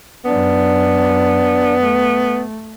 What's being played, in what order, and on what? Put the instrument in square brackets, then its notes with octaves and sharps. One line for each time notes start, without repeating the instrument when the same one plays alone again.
[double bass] F#2 D4 [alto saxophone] B3
[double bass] A3